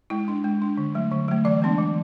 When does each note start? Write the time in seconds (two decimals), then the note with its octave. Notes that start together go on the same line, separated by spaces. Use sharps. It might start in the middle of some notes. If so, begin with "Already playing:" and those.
0.10 G#3 E4
0.28 D4
0.44 G#3
0.62 D4
0.78 D3
0.94 F#3 A3
1.12 D3
1.28 F#3 A3
1.45 E3 D5
1.62 G#3 B3 D4
1.78 E3